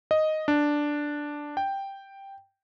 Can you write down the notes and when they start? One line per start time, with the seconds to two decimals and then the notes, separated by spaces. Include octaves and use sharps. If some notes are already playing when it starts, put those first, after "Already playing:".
0.11 D#5
0.48 D4
1.57 G5